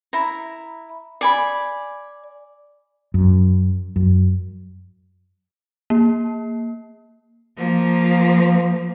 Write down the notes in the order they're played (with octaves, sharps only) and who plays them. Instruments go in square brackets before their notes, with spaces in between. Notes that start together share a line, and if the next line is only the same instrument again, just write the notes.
[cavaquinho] E4 A#5
D5 G#5 B5
[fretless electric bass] F#2
F#2
[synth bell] A#3
[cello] F3 A#3